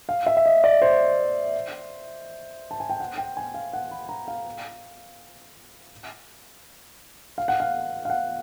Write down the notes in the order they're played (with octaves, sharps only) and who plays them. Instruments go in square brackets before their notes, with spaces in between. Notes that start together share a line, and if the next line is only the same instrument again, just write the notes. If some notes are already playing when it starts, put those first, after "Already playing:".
[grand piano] F5
E5
E5
D#5
D5
C5
A5
G#5
G5
F#5
G5
G#5
F5
F#5
B5
A#5
F5
F5
F#5
F5
F5
F#5